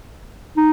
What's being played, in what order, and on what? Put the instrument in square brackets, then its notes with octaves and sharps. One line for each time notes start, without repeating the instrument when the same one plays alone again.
[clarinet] D#4